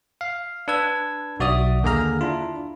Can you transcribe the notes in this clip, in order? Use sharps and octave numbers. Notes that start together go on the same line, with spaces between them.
F5
D4 B4 E6 G#6
B1 F#4 D5 E5 D#6
D#2 D3 A#3 G#4 A#5 F6
D4 E4 F4